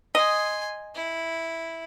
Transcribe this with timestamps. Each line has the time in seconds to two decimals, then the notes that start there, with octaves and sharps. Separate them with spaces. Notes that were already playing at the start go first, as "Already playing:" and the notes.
0.15 D#5 G#5 C6
0.95 E4